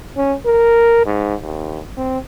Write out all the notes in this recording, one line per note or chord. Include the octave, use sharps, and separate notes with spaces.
C#4
A#4
G#2
D#2
C4